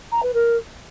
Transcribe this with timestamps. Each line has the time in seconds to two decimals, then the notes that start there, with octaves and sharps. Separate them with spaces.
0.12 A#5
0.23 B4
0.34 A#4